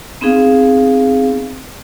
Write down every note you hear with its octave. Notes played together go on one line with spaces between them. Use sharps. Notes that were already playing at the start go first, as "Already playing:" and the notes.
B3 C4 D#4 G#4 F5